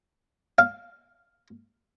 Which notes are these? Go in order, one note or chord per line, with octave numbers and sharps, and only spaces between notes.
F5